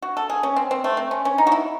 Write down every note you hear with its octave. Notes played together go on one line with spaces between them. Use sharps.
F#4
A4
G#4
C#4
C4
C4
A3
C4
C#4
C#4
D#4
F#4
E4